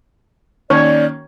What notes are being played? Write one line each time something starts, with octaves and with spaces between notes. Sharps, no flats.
D#3 A#3 C#4 C#5 D5